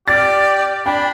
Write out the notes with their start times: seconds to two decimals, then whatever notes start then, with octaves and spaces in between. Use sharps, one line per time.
0.08 G4 D5 F6 A6
0.86 D4 G5 B5